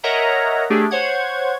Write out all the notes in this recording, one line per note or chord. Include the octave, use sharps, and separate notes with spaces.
A#4 C#5 D#5 E5 F#5 A#5
A3 D4 G4 G#4
C5 C#5 F#5 G#6